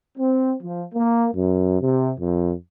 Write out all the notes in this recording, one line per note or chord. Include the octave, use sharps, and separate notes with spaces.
C4
F3
A#3
F#2
C3
F2